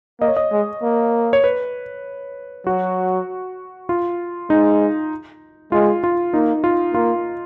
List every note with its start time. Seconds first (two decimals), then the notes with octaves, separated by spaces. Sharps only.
0.20 A#3 D#5
0.28 C#5
0.37 D#5
0.52 G#3
0.83 A#3
1.33 C#5
1.44 B4
2.66 F#3 F#4
3.89 F4
4.50 G#3 D#4
5.72 G#3 F4
6.04 F4
6.34 A#3 D#4
6.64 F4
6.94 A#3 F4